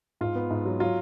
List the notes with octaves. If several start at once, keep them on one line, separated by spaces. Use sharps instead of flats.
G#2 F4
B3
G#2
F#3
F#3 F4